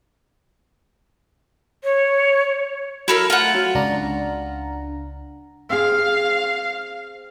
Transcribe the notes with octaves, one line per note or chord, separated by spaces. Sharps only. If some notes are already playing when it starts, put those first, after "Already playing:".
C#5
F#3 E4 A4 A#4
A3 F4 F#5
F#3
C#2 D4 A#5
C4 G#4 F5